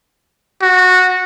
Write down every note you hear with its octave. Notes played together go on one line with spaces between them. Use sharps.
F#4